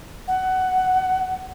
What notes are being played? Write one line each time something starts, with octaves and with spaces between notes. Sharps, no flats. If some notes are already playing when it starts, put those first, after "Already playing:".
F#5